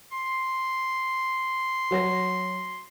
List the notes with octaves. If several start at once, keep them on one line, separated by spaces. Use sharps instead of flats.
C6
F#3 C#5 A#6